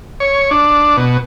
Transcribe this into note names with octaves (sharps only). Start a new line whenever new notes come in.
C#5
D4
B2